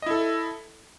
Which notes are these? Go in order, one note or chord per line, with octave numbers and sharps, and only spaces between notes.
E4 A4 D#5